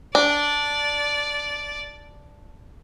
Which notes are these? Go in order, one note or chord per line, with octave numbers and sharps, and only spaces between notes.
D4 D5